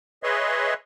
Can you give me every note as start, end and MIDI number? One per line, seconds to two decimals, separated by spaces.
0.23 0.74 68
0.23 0.74 71
0.23 0.74 73
0.23 0.74 75
0.23 0.74 76
0.23 0.74 84